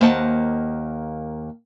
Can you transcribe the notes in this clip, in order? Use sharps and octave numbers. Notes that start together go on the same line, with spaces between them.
D#2 A#3 C5 D#5 F#5 A5